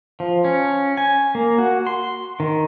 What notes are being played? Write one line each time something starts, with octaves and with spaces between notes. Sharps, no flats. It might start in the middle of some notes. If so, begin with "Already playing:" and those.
F3
C#4
G#5
A#3
F#4
C6
D#3